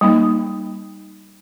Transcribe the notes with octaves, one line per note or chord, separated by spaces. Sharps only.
G3 A#3 D#4